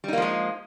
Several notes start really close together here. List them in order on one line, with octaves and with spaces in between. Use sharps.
G3 D#4 A#3 F3 G#3